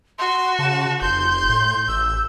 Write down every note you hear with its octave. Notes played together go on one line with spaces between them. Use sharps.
F#4 C6
C#3 A5
F1 C6 G6
A2
A1 E6